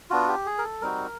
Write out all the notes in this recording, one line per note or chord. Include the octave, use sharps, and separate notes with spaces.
B3 D4 F4 F#4
G4
G#4
A#4
A4
G3 C4 D#4 F#4 A#4